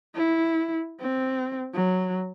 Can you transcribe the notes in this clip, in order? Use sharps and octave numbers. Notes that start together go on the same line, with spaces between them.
E4
C4
F#3